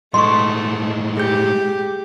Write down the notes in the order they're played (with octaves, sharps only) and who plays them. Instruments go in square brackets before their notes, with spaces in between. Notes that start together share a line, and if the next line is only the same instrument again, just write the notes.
[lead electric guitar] A2 G#3 [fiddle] A3 [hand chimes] D#5 [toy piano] C6 C#6
[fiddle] G4 [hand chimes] G#4 G6